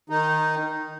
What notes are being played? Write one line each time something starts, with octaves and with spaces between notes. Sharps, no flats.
D#3 D#4